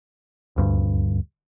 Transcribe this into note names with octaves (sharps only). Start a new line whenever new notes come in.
D#1 D2 G2